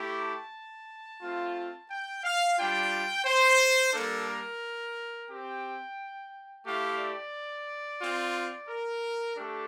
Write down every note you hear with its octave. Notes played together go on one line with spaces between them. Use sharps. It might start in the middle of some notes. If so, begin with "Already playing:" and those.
Already playing: A3 E4 G4
A5
A3 C4 F4
G5
F5
G3 D4 F4 G5
C5
G3 A#3 D4 A4
A#4
C4 G4 G5
A3 E4 G4 F5
D5
C4 F4
A#4
A3 D4 G4 A4